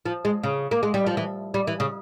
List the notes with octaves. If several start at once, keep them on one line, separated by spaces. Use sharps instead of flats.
F3
G#3
C#3
A#3
G#3
G3
F3
E3
G3
E3
C#3